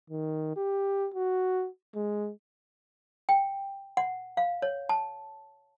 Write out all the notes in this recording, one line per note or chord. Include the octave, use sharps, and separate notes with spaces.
D#3
G4
F#4
G#3
G5
F#5
F5
C#5
A5